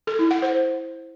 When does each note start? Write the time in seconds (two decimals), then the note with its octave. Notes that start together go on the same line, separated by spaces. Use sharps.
0.07 A4
0.19 E4
0.31 F#5
0.42 C5